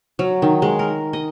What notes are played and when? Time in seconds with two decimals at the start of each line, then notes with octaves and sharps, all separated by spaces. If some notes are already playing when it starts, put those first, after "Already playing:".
0.19 F#3
0.42 D#3
0.62 G#3
0.79 A#4
1.13 D#5